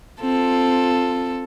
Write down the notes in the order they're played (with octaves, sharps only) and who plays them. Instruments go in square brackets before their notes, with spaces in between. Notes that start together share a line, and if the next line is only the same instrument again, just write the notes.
[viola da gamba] C4 F4 [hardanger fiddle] A4